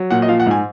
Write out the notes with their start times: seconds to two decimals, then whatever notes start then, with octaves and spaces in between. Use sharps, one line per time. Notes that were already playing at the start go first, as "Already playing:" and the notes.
Already playing: F#3
0.10 A#2 F#5
0.22 D#5
0.28 F3 F5
0.40 F#5
0.46 G#2 G#5